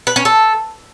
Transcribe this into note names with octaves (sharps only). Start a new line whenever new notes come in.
B4
C#4
A4